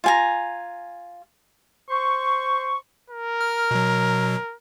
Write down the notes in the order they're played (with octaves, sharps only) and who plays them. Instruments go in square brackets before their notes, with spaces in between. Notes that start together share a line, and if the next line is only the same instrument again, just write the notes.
[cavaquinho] F4 G#5 A#5
[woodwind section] C5 C6 C#6
[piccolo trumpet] A#4
[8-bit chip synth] F6
B2 F#3